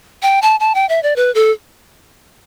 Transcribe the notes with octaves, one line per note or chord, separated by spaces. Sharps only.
G5
A5
A5
G5
E5
D5
B4
A4